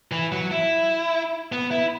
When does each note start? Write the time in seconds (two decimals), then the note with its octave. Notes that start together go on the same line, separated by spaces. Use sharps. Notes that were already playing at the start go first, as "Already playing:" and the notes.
0.12 E3
0.32 F#3
0.51 E4
1.52 B3
1.71 E4